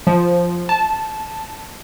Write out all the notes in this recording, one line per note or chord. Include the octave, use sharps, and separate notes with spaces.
F3
A5